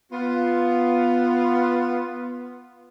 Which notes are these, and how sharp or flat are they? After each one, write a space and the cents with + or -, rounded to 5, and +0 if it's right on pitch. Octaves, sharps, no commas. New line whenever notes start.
B3 +0 F4 +0